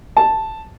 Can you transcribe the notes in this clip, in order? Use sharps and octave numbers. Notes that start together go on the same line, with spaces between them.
A5